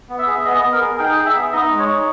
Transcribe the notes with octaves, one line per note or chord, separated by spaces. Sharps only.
B3
E5
G#4
B3 D#5
B3
A#4
G#4
D#4 G5
G#4
E5
B3
D#4 D#5
G#3
C#5
D#4